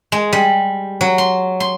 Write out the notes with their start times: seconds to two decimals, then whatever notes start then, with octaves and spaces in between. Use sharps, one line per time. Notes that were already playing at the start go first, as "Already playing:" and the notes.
0.12 G#3
0.33 G3
1.01 F#3
1.18 C6
1.60 C6